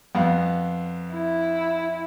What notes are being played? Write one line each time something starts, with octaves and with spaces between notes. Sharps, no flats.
F2 B3 F5
E4